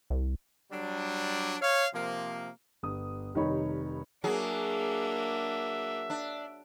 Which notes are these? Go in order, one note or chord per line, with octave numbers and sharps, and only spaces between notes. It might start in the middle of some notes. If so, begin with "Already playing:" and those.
C2
F#3 G3 D4
C#5 F5
C3 F3 A#3
G1 D#6
F1 D#3 G3 D#4 C#5 B5
F#3 A#3 D4 G#4 E5
D4